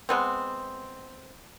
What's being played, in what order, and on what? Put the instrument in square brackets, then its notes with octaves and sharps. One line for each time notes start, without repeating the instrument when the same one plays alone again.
[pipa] G#3 B3 C4